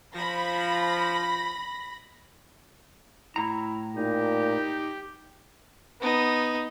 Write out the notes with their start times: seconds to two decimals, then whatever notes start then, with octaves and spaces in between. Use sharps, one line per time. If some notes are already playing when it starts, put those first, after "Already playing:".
0.14 F3 B5 A#6
3.36 A2 E4 A#5
3.96 A#2 D#4 G4
6.01 B3 D#4